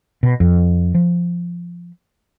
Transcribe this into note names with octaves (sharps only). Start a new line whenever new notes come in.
B2
F2
F3